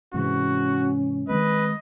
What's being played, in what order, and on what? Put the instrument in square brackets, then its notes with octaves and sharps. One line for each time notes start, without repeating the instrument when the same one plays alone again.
[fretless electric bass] G#2 C3 E3 [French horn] C#4 [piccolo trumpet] F#4
[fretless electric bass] D#3 G#3 C4 [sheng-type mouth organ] B4 [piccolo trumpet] D#5